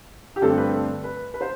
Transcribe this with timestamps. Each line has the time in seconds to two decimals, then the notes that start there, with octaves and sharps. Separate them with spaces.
0.36 G4
0.42 G2 D3 A3 C4 A4
0.57 B4
0.72 A4
1.04 B4
1.34 B4
1.41 C5